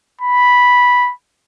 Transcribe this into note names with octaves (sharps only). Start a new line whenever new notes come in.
B5